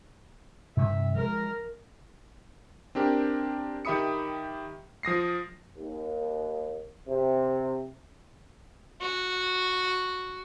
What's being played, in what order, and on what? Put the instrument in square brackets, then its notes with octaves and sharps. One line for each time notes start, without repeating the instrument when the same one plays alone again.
[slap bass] G2 C3 D#3 [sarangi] E5
[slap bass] F3 G#3 [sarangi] A#4
[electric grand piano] C4 D4 G4 A#4
D#3 G4 E5 B5 D#6 C#7
F3 D#6 A#6 C7
[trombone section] D#2
C3
[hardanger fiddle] F#4